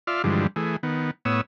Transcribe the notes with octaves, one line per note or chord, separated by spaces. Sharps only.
F4 D5 E5 F6
G2 D3 E3 F3 G3 G#3
E3 A3 G#4
D#3 B3
A2 B3 C#5 D#6 E6